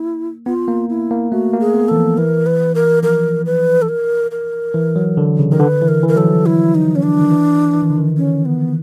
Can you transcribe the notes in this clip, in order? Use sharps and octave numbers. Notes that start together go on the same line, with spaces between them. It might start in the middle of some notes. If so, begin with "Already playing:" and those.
Already playing: A#3 E4
B3 F4
A#3
E4
A#3
A3 F#4
A#3
G#4
B3
E3 A4
F3
E3 A#4
B4
A#4
F3 A#4
B4
A4
A#4
A#4
E3
F#3
D3
C#3
D#3 A#4
D3 B4
E3
A#4
E3
A#4
F#3 A4
F3
E4
D#4
C#4
D4
D#3
E3
E3
D#3
D3
D#3
C#4
B3